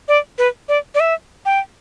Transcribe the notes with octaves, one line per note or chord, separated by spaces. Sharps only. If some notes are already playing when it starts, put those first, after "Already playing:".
D5
B4
D5
D5
E5
G5